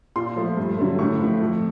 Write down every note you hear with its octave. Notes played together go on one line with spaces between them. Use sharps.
A#2 C6
F3 A3
G2
D3 F#3 A3
A2 C#6
F3 A3
F2